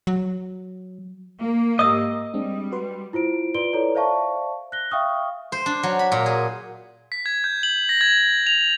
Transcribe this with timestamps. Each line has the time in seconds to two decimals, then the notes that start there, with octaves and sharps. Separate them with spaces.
0.07 F#3
1.38 A#3
1.79 G#2 G4 D#5 D#6 E6
2.34 G3 G#3 C4 D4
2.72 F#4 B4 C6
3.13 E4 F4 C5 D7
3.54 F4 B4 D5 C6 D7 G7
3.73 E4 A4 B4 C#5 D5 A#5
3.95 C5 D5 E5 F5 A5 C#6
4.72 F#6 A#6 G7
4.91 E5 F5 G5 C#6 D#6 F6
5.52 C5
5.66 D4
5.83 F#3
5.99 B5
6.12 A#2
6.26 G#4
7.12 B6
7.26 G#6
7.44 G6
7.63 F#7
7.89 A#6
8.01 G#6
8.18 A#6
8.47 F7